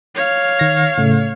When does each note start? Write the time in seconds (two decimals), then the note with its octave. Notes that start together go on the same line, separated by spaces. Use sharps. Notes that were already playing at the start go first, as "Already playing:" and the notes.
0.15 C#5 F5
0.59 D#3 A#6
0.98 A2 C#3 A3